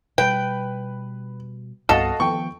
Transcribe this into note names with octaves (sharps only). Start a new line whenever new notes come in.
B2 G3 B4 G5
C2 G2 B3 F#4 A4 D#5 F5
D#3 F3 B3 G5 C#6